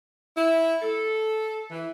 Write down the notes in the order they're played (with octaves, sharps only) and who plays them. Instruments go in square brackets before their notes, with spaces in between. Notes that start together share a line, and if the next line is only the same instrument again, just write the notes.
[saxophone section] E4
A4
E3